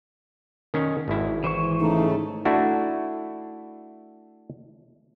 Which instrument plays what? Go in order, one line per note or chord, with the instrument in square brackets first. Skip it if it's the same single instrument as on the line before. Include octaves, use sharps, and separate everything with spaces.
[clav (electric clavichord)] D#3 C#4
G#1 E4
[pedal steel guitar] E3 C5 C#6
[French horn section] C#3 A3 [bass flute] D#4
[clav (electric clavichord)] A3 D4 E4 F#4